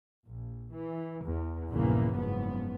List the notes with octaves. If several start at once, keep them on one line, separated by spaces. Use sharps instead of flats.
A#1
E3
E2
A#1 E2 G2 C#3 E3 A#3
F#1 G#2 F3 B3